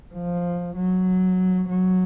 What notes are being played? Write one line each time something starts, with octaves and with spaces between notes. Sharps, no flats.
F3
F#3
F#3